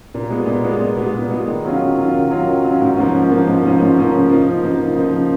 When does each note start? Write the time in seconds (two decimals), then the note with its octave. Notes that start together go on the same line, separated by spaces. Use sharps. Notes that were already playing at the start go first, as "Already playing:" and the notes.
0.14 A#2
0.30 G#3 B3
0.47 A#2
0.64 G#3 B3
0.81 A#2
0.97 G#3 B3
1.14 A#2
1.31 G#3 B3
1.47 D#3
1.65 F#3 C#4 F4
1.80 D#3
1.97 F#3 C#4 F4
2.14 D#3
2.31 F#3 C#4 F4
2.47 D#3
2.63 F#3 C#4 F4
2.81 G#2
2.97 F3 A#3 C#4
3.14 G#2
3.31 F3 A#3 C#4
3.47 G#2
3.63 F3 A#3 C#4
3.80 G#2
3.97 F3 A#3 C#4
4.14 C#3
4.30 F3 A#3 D#4
4.48 C#3
4.64 F3 A#3 D#4
4.80 C#3
4.96 F3 A#3 D#4
5.14 C#3